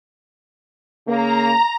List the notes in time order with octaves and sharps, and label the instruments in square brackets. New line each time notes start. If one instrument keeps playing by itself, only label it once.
[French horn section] C#3 A#3 [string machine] A#5